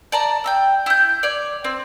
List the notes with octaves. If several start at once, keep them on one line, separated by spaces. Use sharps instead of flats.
D5 A5 A#5
G5 A#5 E6
E4 G6
C#5 D5
C4